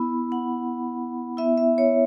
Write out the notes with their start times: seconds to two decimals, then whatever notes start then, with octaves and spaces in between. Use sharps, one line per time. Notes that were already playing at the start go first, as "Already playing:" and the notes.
Already playing: B3 E4 B5
0.32 F#5
1.37 B3 E4 E5
1.58 E5
1.78 C#5